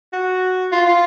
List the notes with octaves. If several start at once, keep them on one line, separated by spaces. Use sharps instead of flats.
F#4
F4
F4